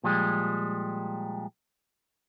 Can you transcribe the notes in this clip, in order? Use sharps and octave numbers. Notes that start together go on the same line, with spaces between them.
A#2 F3 G3 G#3